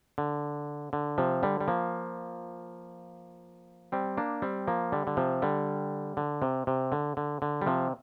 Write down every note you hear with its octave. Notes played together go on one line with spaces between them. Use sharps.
D3
D3
C3 F3
D3 G3
G3
F3 A#3
G3 C4
A#3 D4
G3 C4
F3 A#3
D3 G3
D3
C3 F3
D3 G3
D3
C3
C3
D3
D3
D3
G3
C3 F3